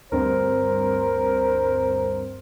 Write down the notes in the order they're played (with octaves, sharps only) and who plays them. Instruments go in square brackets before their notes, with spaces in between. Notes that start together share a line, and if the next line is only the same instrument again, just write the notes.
[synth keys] D2 G2 C4 [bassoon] A#4 [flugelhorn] C5